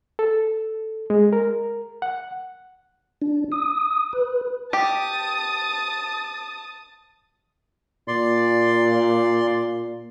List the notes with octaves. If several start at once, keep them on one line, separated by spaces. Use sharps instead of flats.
A4
G#3
A#4
F#5
D4
D#6
B4
G4 A5 D#6
A#2 D5 C6